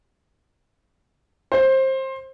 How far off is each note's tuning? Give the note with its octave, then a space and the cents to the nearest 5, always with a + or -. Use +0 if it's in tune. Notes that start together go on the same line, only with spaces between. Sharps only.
C5 +20